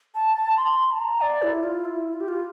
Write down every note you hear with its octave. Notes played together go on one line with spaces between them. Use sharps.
A5
C6
A5
A#5
D5
E4
F4
E4
F4
G4
F4